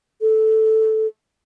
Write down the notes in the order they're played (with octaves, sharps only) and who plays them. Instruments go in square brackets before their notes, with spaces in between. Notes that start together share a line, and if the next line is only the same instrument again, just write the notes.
[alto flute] A4